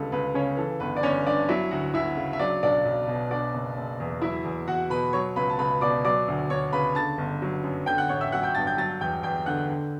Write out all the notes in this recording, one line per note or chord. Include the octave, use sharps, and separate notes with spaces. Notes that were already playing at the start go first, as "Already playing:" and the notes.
Already playing: C#2 D3 G3 A4 B4
C#2 B4
C#3 C#4 C#5
E3 A4
G1 B4
D5
G1 C#4 C#5
G2 D4 D5
F#3 E4 E5
D2 F#4 F#5
D2 E4 E5
C#3
E5
F#3 D4 D5
B1 D4 D5
B1
B2
B2 D4 D5
F#1
F#1
E2
F#3 E4 E5
E2
E2 F#4 F#5
B2 B4 B5
F#3 C#5 C#6
C#2 B4 B5
A5
C#2 B4 B5
B2 D5 D6
F#3 D5 D6
D2
D2 C#5 C#6
C#3 B4 B5
D3 A5 A6
G1
F#3
F#2
D3 G5 G6
F#5 F#6
A1 C#5 C#6
E5 E6
F#3 F#5 F#6
G5 G6
G2 A5 A6
G5 G6
F#3 A5 A6
E2 G5 G6
E2 G5 G6
D3 F#5 F#6
D3